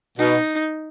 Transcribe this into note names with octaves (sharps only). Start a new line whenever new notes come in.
B2 D#4